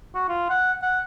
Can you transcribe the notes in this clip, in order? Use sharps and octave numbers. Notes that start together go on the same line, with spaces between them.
F#4
F4
F#5
F#5